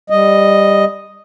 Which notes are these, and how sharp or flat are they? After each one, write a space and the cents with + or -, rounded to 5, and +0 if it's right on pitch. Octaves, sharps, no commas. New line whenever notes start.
G3 +10 D#5 +0